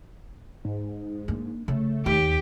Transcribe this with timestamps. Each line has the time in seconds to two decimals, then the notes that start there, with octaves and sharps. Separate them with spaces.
0.65 G#2
1.28 A#3 D4
1.68 C#3 A3
2.06 D#2 G4